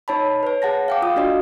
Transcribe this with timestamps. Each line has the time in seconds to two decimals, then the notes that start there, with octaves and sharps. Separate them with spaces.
0.08 D#4 C#5 A5 B5
0.43 B4 C#5
0.62 G#4 F#5 A5 A#6
0.88 F5 G5 D6
1.02 F4 F5 D#6
1.16 D4 F#4 D5 D#5